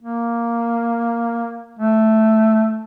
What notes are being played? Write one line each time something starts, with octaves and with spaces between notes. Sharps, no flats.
A#3
A3